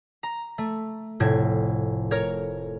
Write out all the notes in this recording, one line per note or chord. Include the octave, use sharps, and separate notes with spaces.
A#5
A3
F1 A2 G#6
A#4 C#5